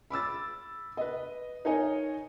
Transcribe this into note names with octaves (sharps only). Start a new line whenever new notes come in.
B5 D6 E6 A6
B4 D#5
D#4 A#4 C#5 D#5 G#5